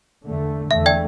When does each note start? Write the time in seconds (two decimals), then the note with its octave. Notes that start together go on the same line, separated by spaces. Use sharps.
0.25 E2 D3 A3
0.71 E2 D3 A3 E5
0.86 D5 G5